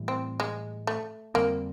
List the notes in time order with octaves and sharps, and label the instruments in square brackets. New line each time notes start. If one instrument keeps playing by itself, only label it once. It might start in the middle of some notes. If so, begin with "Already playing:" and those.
Already playing: [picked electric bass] A2 E3 G3
[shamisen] C4
G#3
A3
[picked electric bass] F2 D3 G3 C4 [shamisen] A#3